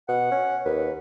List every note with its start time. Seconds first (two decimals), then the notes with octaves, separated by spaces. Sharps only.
0.08 B2 F#5
0.31 C#4
0.65 D#2 B4